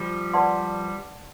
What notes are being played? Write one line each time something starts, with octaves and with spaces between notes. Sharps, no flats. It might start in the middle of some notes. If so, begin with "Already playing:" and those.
Already playing: F3 G3
B4 D5 F#5 A5 C6